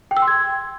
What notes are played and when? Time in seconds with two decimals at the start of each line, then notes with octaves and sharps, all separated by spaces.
0.11 G5
0.17 E6
0.22 C6
0.28 G#6